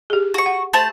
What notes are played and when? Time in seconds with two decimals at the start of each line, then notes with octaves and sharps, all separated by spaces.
0.10 G4 G#4
0.34 F#4 C#6
0.46 F#5
0.73 A3 C5 A5